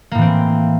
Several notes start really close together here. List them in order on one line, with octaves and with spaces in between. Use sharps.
A#3 A2 E3 C4